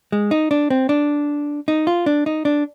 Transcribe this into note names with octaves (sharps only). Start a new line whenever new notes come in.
G#3
D#4
D4
C4
D4
D#4
F4
D4
D#4
D4